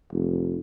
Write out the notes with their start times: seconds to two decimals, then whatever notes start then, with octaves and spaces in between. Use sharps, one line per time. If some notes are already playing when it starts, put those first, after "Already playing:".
0.12 F1